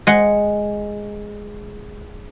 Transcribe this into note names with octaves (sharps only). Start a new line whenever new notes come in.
G#3 F#5